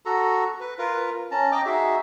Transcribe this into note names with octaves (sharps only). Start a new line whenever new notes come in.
F#4 A4 A#5
B4
F4 A#4 B4
C#4 A5 A#5
D#5 G5 A#5 D6
D#4 F#4 G#4 E5